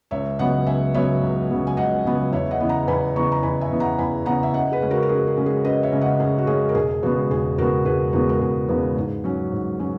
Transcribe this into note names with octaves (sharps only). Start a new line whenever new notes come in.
C#2 C#5 E5
C#3 F#3 B3 D#5 F#5
C#2 E5 G#5
C#3 F#3 B3 C#5 E5
C#2
C#3 F#3 B3
G#5
C#2 D#5 F#5
C#3 F#3 B3
E2 C#5 E5
D#5 F#5
C#3 E3 B3
F#5 A#5
E2 G#5 B5
C#3 E3 B3 A#5 C#6
A#5
E2 G#5 B5
E5 G#5
C#3 E3 B3
F#5 A#5
E2 G#5 B5
C#3 E3 B3 F#5 A#5
E5
F#2 D#5 F#5
G#4 B4
C#3 G#3 C#4
F#4 A#4
A#4
F#2 G#4
G#4
C#3 G#3 C#4
G#4
F#2 B4 D#5
C#5 E5
C#3 G#3 C#4
D#5 F#5
F#2 G#4
F#4
C#3 G#3 C#4 G#4
A#4
E1 G#4
E2 C#3 G#3 B3 F#4
E1 G#4
E2 C#3 G#3 B3 F#4 A#4
E1 G#4 B4
E2 C#3 G#3 B3 F#4 A#4
A#4
E1 G#4
E2 C#3 G#3 B3
G#2
F#3 C#4
G#2
F#3 C#4